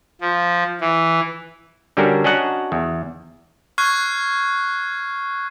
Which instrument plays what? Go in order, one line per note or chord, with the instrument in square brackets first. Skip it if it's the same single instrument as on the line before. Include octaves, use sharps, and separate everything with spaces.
[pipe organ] F3
E3
[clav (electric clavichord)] D3 G3 C#4 D4 F#4 A#4
C#4 D4 F#4 D#5 F#5 A#5
E2
[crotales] C#6 F6 F#6 G#6 C7